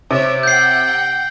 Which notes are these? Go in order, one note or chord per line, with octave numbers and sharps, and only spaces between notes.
C3 C#5 E5 D6
F#5 G5 G6 C7